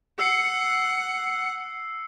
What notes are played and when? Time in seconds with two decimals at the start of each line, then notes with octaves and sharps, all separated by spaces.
0.19 F#5 E6 C7 C#7